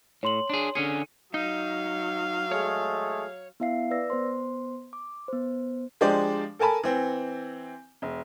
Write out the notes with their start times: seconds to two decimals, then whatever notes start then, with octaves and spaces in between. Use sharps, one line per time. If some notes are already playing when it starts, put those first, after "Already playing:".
0.23 A2 C#5 C6 F#7
0.50 D4 G#4
0.75 D3 C#4 G#4 C#7 D#7
1.34 F#3 D#4 F5
2.51 G#3 A3 G#4 C#5
3.60 B3 E4 E5 F5 C7
3.91 B4 D5 E6 A#6
4.10 B3 C5 C6
4.93 D6
5.28 B3 C5
6.01 F3 G#3 D4 G4 C5 D5
6.59 A4 A#4 G#5 A5 B5
6.83 E3 C4
8.02 E1